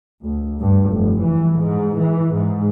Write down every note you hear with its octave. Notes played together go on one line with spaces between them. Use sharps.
D2
G2
F1
E3
G#2
E3
G#2